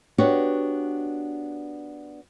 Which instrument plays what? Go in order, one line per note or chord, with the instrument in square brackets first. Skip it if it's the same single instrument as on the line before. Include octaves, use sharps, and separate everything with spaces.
[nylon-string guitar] B3 D4 F#4 G4 C#5 F#5